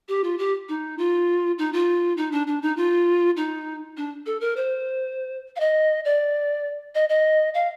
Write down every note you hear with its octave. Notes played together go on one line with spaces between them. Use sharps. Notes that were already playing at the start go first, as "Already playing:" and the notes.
G4
F4
G4
D#4
F4
D#4
F4
D#4
D4
D4
D#4
F4
D#4
D4
A4
A#4
C5
F5
D#5
D5
D#5
D#5
F5